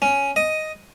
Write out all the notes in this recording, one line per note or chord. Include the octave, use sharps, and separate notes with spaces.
C#4
D#5